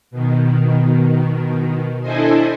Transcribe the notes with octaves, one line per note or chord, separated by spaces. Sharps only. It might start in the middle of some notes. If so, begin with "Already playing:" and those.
B2 D#3
D4 E4 A4 C5 D#5 G#5